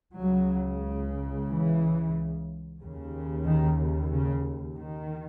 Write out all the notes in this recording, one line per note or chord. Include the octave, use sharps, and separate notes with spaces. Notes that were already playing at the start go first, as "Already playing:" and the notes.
C#2 C#3 F#3
E3
D#2 C#3
D#3
C#3
D#3